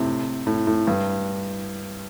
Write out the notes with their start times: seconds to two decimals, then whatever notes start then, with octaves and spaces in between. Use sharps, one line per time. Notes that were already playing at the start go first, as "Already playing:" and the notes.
Already playing: A2 C3
0.47 A2
0.67 A2
0.87 G2